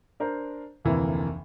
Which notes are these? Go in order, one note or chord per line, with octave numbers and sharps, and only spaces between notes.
D4 A#4 C5
F1 D2 C3 E3 A#3